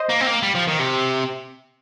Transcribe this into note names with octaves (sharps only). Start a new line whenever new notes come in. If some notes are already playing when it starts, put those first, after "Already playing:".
Already playing: C5 D#5
A#3
C4
A#3
G3
F3
D#3
C3